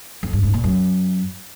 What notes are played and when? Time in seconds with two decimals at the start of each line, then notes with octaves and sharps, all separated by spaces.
0.23 F2
0.33 G2
0.43 G#2
0.54 A#2
0.64 F#2